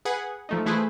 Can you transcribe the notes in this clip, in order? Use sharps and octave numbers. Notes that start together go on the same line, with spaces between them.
G#4 B4 F#5 G#6
F3 A3 D#4
E3 A3 E4 G#4 B4 C5